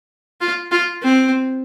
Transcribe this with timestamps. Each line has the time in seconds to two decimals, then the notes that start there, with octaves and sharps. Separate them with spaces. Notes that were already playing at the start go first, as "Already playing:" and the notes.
0.41 F4
0.71 F4
1.03 C4